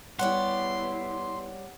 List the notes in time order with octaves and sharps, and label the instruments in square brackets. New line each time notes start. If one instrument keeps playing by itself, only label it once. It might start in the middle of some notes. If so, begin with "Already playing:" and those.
[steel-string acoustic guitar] G3 C#5 D5 [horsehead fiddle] B3 E4 [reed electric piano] F#5 [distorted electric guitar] C6